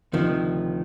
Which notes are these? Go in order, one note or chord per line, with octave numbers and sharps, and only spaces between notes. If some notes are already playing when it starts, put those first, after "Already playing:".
D2 C3 D#3 F3